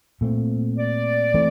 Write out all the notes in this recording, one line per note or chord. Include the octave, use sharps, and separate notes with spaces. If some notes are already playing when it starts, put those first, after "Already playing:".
A#2 A3 C4
D5
E3 A3 C4